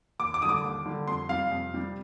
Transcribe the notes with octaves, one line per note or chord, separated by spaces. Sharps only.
D#2 D6
D6
D3 G3 D6 D#6
D#2
D3 G3
F2 C6
C3 G3 F5
F2
C3 G3